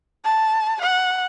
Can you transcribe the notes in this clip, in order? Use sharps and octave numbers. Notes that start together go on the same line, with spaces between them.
A5
F#5